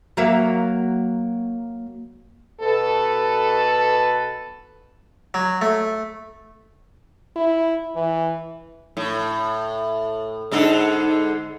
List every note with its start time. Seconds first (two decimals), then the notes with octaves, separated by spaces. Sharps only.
0.17 F#3 A#3 E5
2.61 B2 A4 B4
5.34 F#3
5.62 A3
7.36 E4
7.95 E3
8.97 A2
10.52 G#2 D3 A4